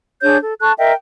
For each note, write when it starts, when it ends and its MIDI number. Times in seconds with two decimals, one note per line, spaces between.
0.22 0.36 62
0.22 0.36 68
0.22 0.36 73
0.22 0.36 91
0.42 0.55 69
0.61 0.72 69
0.61 0.72 81
0.61 0.72 85
0.61 0.72 90
0.78 0.93 70
0.78 0.93 75
0.78 0.93 76
0.78 0.93 79